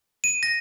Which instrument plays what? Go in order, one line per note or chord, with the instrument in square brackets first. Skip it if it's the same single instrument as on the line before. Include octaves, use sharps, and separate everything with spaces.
[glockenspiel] D#7
A#6